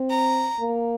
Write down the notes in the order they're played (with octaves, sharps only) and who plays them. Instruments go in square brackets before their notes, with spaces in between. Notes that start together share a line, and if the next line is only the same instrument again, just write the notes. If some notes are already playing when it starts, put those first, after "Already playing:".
Already playing: [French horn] C4
[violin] A#5
[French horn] A#3